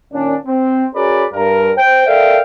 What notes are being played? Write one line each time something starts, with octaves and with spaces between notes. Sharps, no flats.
A#2 D#3 C#4 D4
C4
C#4 F#4 G#4 A#4 B4 D5
G2 A#4
C5 G5
A4 A#4 D5 E5 F5 G5